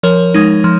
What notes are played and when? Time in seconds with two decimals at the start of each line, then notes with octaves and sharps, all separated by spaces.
0.03 F3 A#4 C#5
0.34 G#3 D#4
0.64 F3